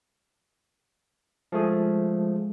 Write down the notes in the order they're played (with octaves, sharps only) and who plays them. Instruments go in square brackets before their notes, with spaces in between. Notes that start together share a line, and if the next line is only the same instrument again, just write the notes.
[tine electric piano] F3 A3 G#4 [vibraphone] G#3